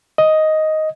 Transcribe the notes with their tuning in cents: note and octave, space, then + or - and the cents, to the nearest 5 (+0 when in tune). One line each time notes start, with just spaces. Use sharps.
D#5 +5